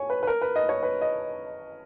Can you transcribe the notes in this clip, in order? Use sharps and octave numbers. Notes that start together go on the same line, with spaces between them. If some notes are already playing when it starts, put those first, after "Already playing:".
Already playing: C#5 G#5
B4
B4
A#4
B4
D#5
C#5
B4
D#5